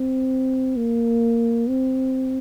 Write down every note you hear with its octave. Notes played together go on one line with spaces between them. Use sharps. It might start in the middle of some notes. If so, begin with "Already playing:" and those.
Already playing: C4
A#3
C4